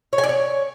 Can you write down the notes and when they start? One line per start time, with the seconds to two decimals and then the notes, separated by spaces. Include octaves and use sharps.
0.13 C#5
0.18 G#5
0.24 D5
0.29 C#5